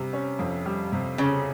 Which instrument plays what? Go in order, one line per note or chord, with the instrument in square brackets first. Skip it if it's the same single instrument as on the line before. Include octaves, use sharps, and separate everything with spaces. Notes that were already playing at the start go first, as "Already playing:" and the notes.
Already playing: [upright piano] C3 G3
C#4
F2
G3
C3
[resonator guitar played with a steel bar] C#3 [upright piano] C#4